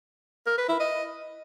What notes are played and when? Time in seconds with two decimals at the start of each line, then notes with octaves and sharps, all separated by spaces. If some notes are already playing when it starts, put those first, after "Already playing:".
0.46 A#4
0.58 B4
0.69 E4
0.80 D#5